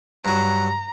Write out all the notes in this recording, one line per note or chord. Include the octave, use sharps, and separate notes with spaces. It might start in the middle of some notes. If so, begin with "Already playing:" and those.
G2 F#3 A#5